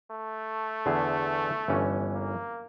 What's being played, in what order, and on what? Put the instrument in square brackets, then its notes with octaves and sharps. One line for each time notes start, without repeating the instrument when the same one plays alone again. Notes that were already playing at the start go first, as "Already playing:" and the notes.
[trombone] A3
[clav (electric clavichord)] E2 D3 G#4
G1 E3 C#4
[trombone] A#3